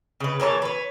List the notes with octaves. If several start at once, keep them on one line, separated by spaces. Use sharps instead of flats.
C#3 B4
A#2 E3 C#5 A5
B4 C#5